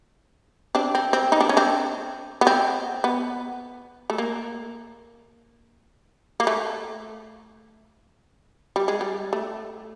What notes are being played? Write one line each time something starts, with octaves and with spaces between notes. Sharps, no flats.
C4 D4
C4
C4
D#4
D4
C#4
C4 D4
B3
C4
B3
A3
A#3
A#3
A3
G3
G#3
G3
A3